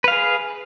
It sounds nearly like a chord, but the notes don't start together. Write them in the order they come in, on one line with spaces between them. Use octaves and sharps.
B4 F5 G#4